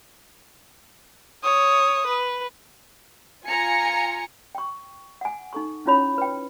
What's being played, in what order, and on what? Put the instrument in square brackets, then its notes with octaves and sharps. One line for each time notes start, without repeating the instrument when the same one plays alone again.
[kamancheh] C#5 D#6
B4
[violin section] F4 G#5 A#5 C#7
[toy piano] G5 C#6
F#5 G#5
D#4 A4 C#6
C#4 E4 F4 C#5 B5
B4 G5